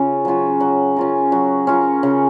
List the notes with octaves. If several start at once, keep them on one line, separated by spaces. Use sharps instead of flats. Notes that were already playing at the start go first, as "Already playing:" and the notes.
Already playing: C#3 C#4 F4
F#3 C#4 F4
F#3
C#4 F4 A#4
F#3
C#4 F4 A#4
C#3